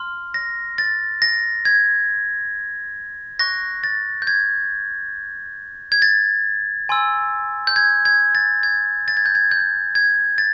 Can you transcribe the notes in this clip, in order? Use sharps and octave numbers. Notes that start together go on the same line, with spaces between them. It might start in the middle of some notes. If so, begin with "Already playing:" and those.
Already playing: C6 F6
A#6
A6
A#6
G#6
C#6 F#6 A#6
A6
G6
G#6
G#6
A6
G#5 C6 E6
G6
G#6
G#6
A6
G#6
A6
G#6
G6
G#6
G6
G#6
A6